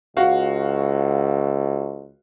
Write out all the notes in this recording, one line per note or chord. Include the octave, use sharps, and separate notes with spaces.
C#2 F#4 F5